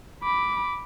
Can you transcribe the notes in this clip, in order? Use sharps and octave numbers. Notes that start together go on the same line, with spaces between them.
B5 D6